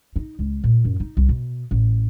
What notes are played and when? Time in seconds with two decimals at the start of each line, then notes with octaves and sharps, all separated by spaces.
0.16 D#4
0.39 C#2
0.64 A#2
0.85 F#2
1.00 D#4
1.17 C2
1.29 B2
1.71 A1